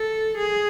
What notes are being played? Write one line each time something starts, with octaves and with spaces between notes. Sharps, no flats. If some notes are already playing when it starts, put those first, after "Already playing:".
Already playing: A4
G#4